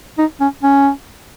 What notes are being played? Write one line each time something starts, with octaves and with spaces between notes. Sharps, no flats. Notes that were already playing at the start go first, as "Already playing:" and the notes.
D#4
C#4
C#4